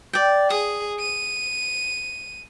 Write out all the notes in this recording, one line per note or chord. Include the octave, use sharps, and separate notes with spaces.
D5 G5
G#4 D#6
D#7